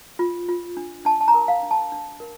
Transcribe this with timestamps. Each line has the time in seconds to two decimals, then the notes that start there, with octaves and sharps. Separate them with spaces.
0.19 F4
0.49 F4
0.77 D4
1.05 D4 A5
1.21 A5
1.28 A#5
1.34 A#4
1.48 F5
1.63 D4
1.71 A5
1.92 D4
2.20 A#4